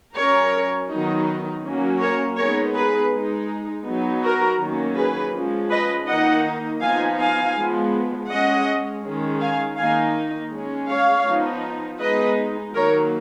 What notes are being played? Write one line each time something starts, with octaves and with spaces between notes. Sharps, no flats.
F#3 C#4 A#4 C#5
D#3 F#3 B3 D#4
F#3 A#3 C#4
A#4 C#5
G#3 B3 D#4 A#4 C#5
G#4 B4
G#3 D#4
F#3 B3 D#4
F#4 A#4
D#3 F#3 A#3 C#4
G#4 B4
F3 G#3 C#4
B4 D#5
D#3 A#3 D#4 D#5 F#5
F3 B3 D#4 F5 G#5
F5 G#5
F3 G#3 B3
G#3 C#4 D#5 F#5
D#3 G#3 C#4
F5 G#5
D#3 A#3 D#4 F5 G#5
G#3 C#4
C#5 F5
F3 B3 D#4
G#3 B3 D#4 B4 D#5
D#3 F#3 A#3 D#4 A#4 C#5